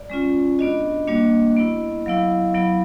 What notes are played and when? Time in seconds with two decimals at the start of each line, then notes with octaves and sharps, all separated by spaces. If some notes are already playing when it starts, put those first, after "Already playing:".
Already playing: D5
0.10 G#3 C#4 F4
0.59 B3 D4 F#4 D#5
1.07 G3 A#3 D4 F#4
1.57 B3 E4
2.06 F#3 B3 E4 F5
2.54 F#3 B3 E4